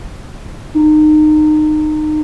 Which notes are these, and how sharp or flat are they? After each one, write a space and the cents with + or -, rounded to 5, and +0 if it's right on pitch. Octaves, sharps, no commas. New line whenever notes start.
D#4 -25